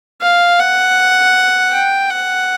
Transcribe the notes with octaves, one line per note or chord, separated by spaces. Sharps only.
F5
F#5
G5
F#5